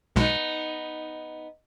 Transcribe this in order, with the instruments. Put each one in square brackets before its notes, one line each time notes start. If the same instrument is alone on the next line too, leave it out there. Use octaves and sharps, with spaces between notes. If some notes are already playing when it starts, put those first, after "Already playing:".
[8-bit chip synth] B1 B2 G#3 [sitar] B3 D#4